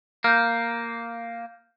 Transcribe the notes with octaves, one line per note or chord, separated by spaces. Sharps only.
A#3 F6 G6